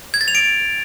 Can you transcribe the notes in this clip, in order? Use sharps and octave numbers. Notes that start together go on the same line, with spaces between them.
G#6
A6
F7
D7